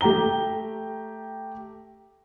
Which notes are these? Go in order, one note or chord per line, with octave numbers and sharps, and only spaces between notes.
A3 G4 G5 A#5 G7